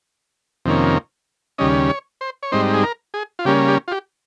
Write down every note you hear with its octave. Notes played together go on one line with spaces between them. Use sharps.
F2 C3 D#3 A#3 C#4
D#2 C#3 G3 C#4 D#5
C#5
C5
C#5
G#2 G3 C4 D#4 C5
G#4
A#4
G#4
F4
C#3 G3 A#3 C#4 G4
G4
F4
G4